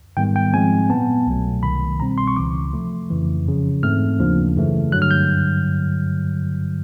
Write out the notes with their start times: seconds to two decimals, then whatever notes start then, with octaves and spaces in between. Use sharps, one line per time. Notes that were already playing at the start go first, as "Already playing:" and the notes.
0.17 G#2 D#3 G3 B3 G5
0.36 G5
0.53 G#2 F3 G#3 C4 G#5
0.90 A#2 F#3 B3 A5
1.27 C2 B2 F#3 A3
1.63 C2 C3 D#3 B5
2.00 B2 G3 C4 A#5
2.18 C6
2.28 C#6
2.36 C#2 C#3 E3 D6
2.73 C3 F3 A3
3.10 F2 C#3 E3
3.46 F#2 C#3 F3
3.83 G#2 E3 A3 C4 F6
4.19 D#2 C#3 F3 A#3 D4
4.56 F#2 C#3 E3 A3
4.92 G2 D3 F#3 F#6
5.02 F6
5.11 G6